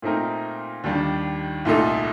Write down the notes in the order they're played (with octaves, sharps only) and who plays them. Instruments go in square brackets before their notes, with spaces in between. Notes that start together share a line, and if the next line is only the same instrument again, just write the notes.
[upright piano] A#2 A3 C4 D#4 A#4
D#2 D#3 G3 D4
C2 A#2 A3 D#4 A4